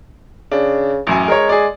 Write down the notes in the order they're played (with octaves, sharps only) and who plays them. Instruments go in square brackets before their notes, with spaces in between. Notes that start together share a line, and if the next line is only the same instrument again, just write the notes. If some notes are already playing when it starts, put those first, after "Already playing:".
[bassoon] C#3 [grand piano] D4
[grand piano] A1 F#2 G#5
[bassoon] G#3 [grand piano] A#4 C#5
[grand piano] G#4 D5